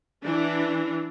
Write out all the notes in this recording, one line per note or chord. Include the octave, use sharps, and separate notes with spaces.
E3 D4